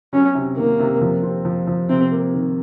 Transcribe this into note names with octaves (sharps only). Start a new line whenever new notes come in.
F#3 C#4
C3
D#3 A#3
C3
F3
C4
F3
F3
C3 C4
A#3
D#3